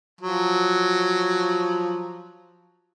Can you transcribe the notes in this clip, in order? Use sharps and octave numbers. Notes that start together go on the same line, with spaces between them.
F3 F#3